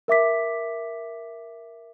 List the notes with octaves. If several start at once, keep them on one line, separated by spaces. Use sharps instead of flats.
A#4 E5 D6 B6